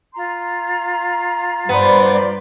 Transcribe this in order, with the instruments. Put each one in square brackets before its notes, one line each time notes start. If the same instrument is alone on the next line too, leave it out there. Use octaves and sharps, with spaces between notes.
[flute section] F4 A#5 C6
[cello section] G2 C5 D5 [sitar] B3